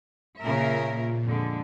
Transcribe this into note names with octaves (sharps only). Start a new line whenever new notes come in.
A#2 C#3 A#4 E5
F2 D3 G#3